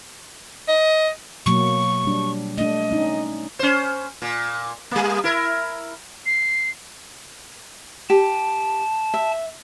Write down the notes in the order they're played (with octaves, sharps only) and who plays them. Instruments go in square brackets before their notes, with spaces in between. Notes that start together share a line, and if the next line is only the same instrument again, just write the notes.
[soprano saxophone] D#5
[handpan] B2 F#3 A#3 [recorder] C#6
[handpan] G3 D4
[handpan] A3 D4 [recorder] D#5
[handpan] C#4 D#4
[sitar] C#4 C5
A#2
G3 A#3
E4 A#4
[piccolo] C7
[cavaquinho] G4 [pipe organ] A5
[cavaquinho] E5